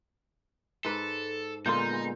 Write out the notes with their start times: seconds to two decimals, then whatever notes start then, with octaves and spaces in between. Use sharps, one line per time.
0.85 G#2 A4 B4
1.66 A#2 D3 G#3 B3 D#4 F4 C6 G6